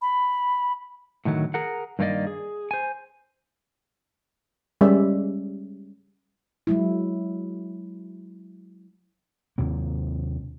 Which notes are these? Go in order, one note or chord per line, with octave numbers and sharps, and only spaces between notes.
B5
A2 D3 D#3 F#3
G#4 A#4 F#5
G2 D#3 A#3 C4 D5 D#5
G#4
C5 G#5
G3 G#3 C#4 D5 E5
F#3 G#3 E4
D#2 C3 A#3